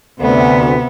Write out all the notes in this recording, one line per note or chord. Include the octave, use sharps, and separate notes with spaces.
D2 C3 B3